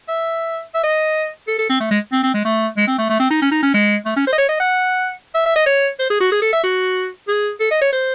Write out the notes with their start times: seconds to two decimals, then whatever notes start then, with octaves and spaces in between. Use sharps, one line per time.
0.08 E5
0.74 E5
0.83 D#5
1.48 A4
1.59 A4
1.70 C4
1.80 A3
1.91 G#3
2.12 C4
2.23 C4
2.34 G#3
2.45 A3
2.77 G#3
2.87 C4
2.98 A3
3.10 A3
3.20 C4
3.30 D#4
3.42 C#4
3.52 D#4
3.63 C#4
3.74 G#3
4.05 A3
4.16 C#4
4.27 C5
4.32 D#5
4.38 C#5
4.49 D#5
4.60 F#5
5.35 E5
5.46 E5
5.56 D#5
5.66 C#5
5.99 C5
6.10 G#4
6.20 F#4
6.32 G#4
6.42 A4
6.53 E5
6.63 F#4
7.28 G#4
7.60 A4
7.71 D#5
7.81 C#5
7.92 C5